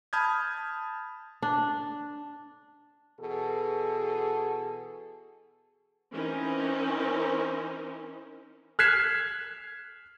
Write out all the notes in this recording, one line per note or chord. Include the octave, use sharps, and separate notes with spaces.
A5 B5 D#6 F6 G6 G#6
D4
B2 E3 G#4 A4
E3 C4 C#4 D#4 A#4 C5
F6 F#6 G#6 B6 C7 E7